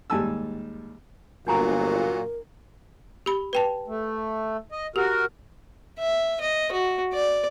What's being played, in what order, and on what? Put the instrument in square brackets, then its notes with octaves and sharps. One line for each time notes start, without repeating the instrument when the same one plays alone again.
[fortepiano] D#2 G#2 G3 G#5 A5 E6
[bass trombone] G1 [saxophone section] A#2 F#3 [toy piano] D4 G#5 A#5 [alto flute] A#4
[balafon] G4 B5
B4 G5 A5
[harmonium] A3
D#5
[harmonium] F#4 A#4 [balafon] G4
[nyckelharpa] E5
D#5
F#4
D5